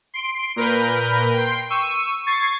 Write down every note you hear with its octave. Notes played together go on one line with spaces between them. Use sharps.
C6 D7
A#2 A#4 B4 G6
G5 C6
C#6 E6 D#7
C#6 G#6 A6 C7